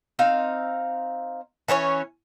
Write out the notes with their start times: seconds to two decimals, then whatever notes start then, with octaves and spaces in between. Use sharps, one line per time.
0.19 C4 D#4 F5
1.68 E3 C#4 D#4 C#5